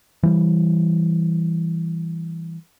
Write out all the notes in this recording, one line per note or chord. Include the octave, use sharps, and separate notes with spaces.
E3 G3